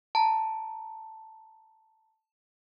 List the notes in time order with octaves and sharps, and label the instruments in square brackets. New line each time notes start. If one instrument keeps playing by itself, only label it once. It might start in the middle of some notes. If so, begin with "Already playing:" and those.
[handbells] A5 A#5